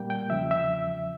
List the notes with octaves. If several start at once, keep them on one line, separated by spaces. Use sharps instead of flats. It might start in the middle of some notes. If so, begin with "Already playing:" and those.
Already playing: A#2 G3 A#3 G5
G5
E2 C#3 F3 E5
E5